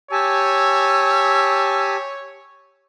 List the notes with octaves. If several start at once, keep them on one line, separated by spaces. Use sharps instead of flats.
G4 C#5 G#5 A5 E6